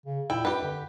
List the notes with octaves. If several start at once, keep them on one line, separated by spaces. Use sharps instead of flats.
C#3
A#2 E4 G5
F#2 G4 B4
D3